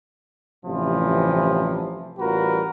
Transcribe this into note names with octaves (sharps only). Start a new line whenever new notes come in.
A1 G2 C3 E3 F3
A1 G3 F4 F#4 A#4 B4